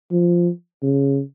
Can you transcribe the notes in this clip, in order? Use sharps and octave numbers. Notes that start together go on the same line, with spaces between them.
F3
C#3